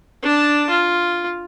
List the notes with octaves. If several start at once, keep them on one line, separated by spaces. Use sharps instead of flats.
D4 A5
F4